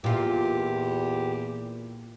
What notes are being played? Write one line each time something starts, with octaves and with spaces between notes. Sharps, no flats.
E2 A#2 F4 G4